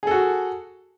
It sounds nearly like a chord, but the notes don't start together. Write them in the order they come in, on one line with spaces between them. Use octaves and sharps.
G#4 A4 F#4